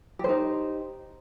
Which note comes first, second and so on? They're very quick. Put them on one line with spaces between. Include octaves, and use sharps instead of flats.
G4 C5 D#4